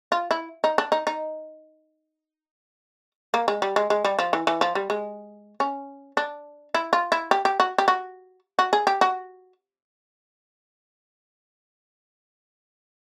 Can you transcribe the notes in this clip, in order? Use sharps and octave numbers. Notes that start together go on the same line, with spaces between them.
F4
E4
D#4
D4
D#4
D#4
A#3
G#3
G3
G#3
G#3
G3
F3
E3
E3
F3
G3
G#3
C#4
D4
E4
F4
E4
G4
G4
F#4
G4
F#4
F#4
G#4
G4
F#4